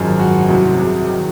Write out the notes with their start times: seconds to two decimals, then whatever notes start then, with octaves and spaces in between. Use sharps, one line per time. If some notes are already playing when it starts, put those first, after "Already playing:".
Already playing: G#1 F#2 F3 G#3
0.19 F#4
0.48 C2 C3 F#3 F#4
0.78 G#4
1.07 D#3 F#3